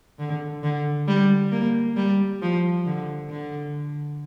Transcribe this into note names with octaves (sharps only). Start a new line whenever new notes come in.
D3
D3
G3
A#3
G3
F3
D3
D3